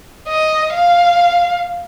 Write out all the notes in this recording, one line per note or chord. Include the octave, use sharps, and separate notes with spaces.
D#5
F5